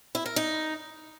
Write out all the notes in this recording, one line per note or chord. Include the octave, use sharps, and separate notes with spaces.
E4
A#4
D#4